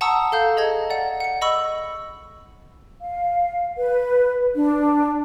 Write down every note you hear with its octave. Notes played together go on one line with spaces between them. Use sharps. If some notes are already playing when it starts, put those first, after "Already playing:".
F#5 A5 A#5 C#6 D#6 E6
A4 F5 G6
G#4 D#5 A5 A#5 G#6 A#6
D5 F#5
F#5 C#7
D#5 B5 C#6 E6
F5
B4
D4